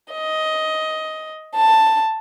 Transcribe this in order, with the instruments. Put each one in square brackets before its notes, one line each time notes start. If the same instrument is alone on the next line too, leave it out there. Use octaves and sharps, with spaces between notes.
[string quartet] D#5
A5